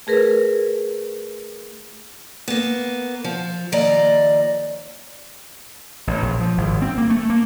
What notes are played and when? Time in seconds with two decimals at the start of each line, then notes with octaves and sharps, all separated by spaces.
0.07 A3 G#4 A#4 B4
2.48 A#3 B3
3.24 F3
3.72 D#2 F3 D5 D#5 A#5
6.07 A1
6.22 A#1
6.40 F3
6.58 G#1
6.82 C4
6.98 A#3
7.10 A3
7.30 A#3